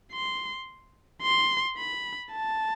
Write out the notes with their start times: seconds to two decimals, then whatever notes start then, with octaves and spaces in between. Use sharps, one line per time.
0.12 C6
1.22 C6
1.77 B5
2.32 A5